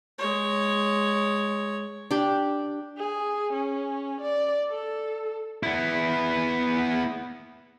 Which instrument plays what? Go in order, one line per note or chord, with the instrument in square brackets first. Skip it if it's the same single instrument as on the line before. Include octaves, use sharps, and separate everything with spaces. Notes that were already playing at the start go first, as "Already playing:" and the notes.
[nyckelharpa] G#3 C#5
[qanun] D4 G4
[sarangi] G#4
C#4
D5
A4
[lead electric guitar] B3 E4